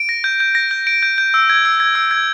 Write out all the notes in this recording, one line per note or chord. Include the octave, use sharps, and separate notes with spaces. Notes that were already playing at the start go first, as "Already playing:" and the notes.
Already playing: D7
A#6
G6
G6
A#6
G6
D7
G6
G6
E6
G#6
E6
G#6
E6
G#6